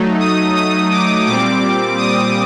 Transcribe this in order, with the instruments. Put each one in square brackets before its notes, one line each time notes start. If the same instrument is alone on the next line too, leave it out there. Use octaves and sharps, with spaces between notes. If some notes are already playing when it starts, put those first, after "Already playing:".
Already playing: [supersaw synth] F#3 A3 D#4
D#6
D#6
D6
A#2 G3 C4 D6
D#6